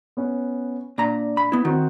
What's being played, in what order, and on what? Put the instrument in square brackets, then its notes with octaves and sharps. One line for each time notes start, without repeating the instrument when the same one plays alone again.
[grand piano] B3 C#4
[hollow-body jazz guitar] A#2 A#5 [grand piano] D4
[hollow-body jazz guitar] B5
B3 E4
[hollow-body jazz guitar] D#3 [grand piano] C4 F#4